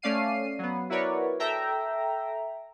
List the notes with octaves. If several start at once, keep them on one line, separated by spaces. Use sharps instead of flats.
A3 C#4 D5 F5 C7 D#7
F#3 B3
E4 F#4 A#4 B4 C#5 D5
A4 E5 G5 A#5